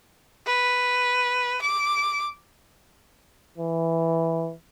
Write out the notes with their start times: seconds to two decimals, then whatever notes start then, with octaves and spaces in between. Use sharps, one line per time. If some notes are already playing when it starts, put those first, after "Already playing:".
0.47 B4
1.62 D6
3.58 E3